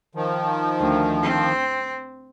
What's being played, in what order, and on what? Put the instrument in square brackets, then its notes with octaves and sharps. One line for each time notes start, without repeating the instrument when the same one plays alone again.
[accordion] D#3 F3
[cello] D2
C4